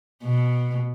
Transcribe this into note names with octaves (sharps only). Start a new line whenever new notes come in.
B2